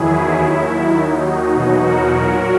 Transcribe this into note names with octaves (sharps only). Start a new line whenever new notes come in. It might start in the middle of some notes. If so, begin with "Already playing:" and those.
Already playing: E2 D#3 F#3 E4 G#4
D#2 D#3 F#3 E4
D#2 D#3 F#3 D#4
D#4 F#4
E2 B2 F#3
F#4 A#4
A#2 F#3